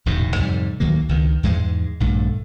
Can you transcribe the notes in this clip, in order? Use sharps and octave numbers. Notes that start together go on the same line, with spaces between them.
D1 E2 G#2 B2
F2 G#2 C3 G3
D2 D#3 F#3 A#3
C#2 D#3
E2 G#2 G#3
A#1 G2 D3 A3